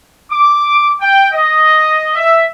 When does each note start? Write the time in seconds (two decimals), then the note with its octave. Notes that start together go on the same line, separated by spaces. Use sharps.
0.30 D6
1.01 G5
1.32 D#5
2.16 E5